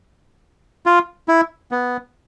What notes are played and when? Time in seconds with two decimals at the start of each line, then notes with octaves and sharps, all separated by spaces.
0.86 F4
1.28 E4
1.72 B3